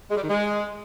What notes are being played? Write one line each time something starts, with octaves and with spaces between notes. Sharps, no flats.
G#3
G3
D#3
G#3